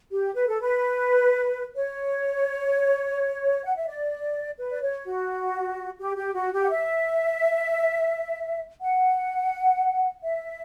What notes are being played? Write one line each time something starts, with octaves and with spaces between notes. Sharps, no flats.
G4
B4
A4
B4
C#5
F#5
E5
D5
B4
D5
C#5
F#4
G4
G4
F#4
G4
F#5
E5
F#5
E5